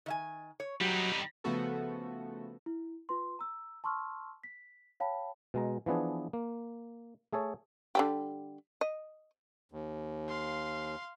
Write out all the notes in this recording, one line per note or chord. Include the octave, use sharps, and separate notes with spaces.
D#3 E5 G#5
C#5
F#3 G3 D#4 G4
C#3 F3 A3 B3 F#4 A4
E4
F4 B4 C6
A#5 E6
A5 C6 C#6 E6 F6
B6
C#5 F5 G5 A5 B5
B2 G#3 A#5
E3 F3 B3 D4 G#4
A#3
A3 G#4 A4 C#5
D3 G3 G4
D#5
D#2
F5 C6